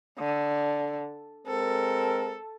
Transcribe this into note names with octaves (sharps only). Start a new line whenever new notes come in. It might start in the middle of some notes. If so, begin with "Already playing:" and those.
D3
G#3 C4 A4 A#4